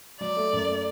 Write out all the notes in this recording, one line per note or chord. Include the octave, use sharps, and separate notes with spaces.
F#3 D5
A3
F#2
A3